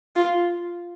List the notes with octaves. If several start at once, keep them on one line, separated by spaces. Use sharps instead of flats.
F4